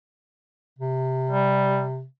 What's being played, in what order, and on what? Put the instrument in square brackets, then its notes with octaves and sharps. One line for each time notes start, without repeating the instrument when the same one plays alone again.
[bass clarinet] C3
[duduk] G3